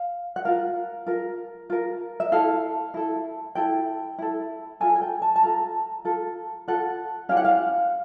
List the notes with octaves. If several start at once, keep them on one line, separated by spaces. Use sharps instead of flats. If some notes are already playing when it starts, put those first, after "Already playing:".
Already playing: F5
F#5
F4 A#4 F5
F4 A#4
F4 A#4
E5
E4 A4 F5
E4 A4
E4 A4 G5
E4 A4
F4 A4 G#5
G#5
G5
A5
A5
F4 A4 A#5
F4 A4
F4 A4 F#5
C#4 E4 G4 F5
F#5
F5